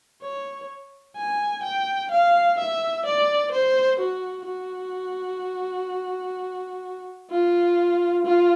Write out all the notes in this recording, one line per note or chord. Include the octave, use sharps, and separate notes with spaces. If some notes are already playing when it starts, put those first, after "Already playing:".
C#5
G#5
G5
F5
E5
D5
C5
F#4
F#4
F4
F4